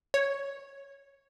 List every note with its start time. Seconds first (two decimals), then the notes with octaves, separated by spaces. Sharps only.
0.14 C#5